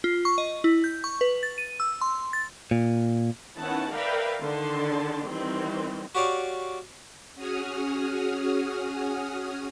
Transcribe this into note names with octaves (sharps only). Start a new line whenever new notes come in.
F4
C#6
D#5
E4
G6
C#6
B4
A6
D#7
E6
C6
A6
A#2
D#3 B3 C#4 E4 F#5 A5
A#4 B4 D5 E5 F5 G5
D3 D#3 A5 C6
D#3 E3 G3 C4
F#4 G4 C#5 D5 F5
C#4 F#4 G#4 D#6 F6